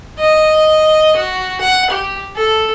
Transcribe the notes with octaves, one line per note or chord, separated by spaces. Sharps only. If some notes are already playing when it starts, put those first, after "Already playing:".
D#5
F#4
F#5
G4
A4